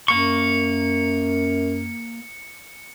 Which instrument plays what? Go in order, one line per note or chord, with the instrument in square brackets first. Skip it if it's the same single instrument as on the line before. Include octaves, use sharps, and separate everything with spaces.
[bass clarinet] F#2 [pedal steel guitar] A#3 C#6 [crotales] C#7